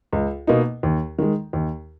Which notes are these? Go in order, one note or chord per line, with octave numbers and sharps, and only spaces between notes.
C#2
B2 A#3 D#4
D#2
D#3 G#3
D#2